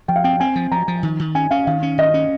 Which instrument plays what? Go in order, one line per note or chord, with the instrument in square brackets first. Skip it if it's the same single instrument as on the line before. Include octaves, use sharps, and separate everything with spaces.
[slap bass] F3 [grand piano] G5
[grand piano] F5
[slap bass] C4 [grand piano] G5
[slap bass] C4 [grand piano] G#5
[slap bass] F3
[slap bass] F3 [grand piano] A#5
[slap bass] F3
D#3
D#3
[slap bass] C#4 [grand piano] G#5
[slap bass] C#4 [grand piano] F5
[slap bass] D#3 [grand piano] F5
[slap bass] C#4
[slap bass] D#3 [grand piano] D#5
[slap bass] C#4